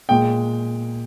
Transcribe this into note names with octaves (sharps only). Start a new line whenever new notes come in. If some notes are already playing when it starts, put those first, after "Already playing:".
A#2 G#3 G5